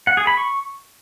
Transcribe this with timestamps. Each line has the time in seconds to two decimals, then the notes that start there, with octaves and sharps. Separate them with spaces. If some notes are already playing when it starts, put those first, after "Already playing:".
0.07 F#5
0.17 G#4
0.27 B5
0.37 C#6